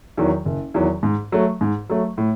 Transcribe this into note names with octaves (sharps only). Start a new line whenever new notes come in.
E2 D#3 F#3
F#1
E2 D#3 F#3
G#2
F#3 A3
G#2
F#3 A3
A2